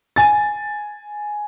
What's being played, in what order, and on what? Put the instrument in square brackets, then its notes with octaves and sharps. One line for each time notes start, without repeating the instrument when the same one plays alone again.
[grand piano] G#5 A6